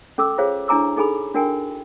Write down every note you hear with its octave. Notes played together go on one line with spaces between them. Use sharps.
C#4 A4 D6 E6
F4 G#4 C5 C#5 F5
D4 E4 G#5 A#5 D6 E6
D#4 G#4 A4 G#5 B5
D4 F#4 A#4 G5 G#5